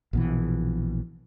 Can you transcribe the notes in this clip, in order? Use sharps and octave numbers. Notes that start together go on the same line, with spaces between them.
A#1 B2 E3